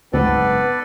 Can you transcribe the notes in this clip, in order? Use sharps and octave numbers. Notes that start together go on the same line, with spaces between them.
F#1 D2 G#2 B3 C4 A4 B4 D5